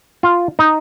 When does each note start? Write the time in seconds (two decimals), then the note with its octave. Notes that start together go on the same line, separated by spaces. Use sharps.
0.23 F4
0.59 D#4